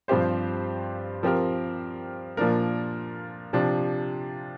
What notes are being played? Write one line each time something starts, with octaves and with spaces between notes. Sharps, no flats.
G2 F3 C4 G4 C5
F3 C4 G4 A#4
A#2 F3 D4 A#4
C3 F3 D4